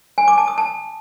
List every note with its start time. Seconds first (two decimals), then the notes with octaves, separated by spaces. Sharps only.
0.18 G#5
0.28 D6
0.38 A5
0.48 D#6
0.58 A5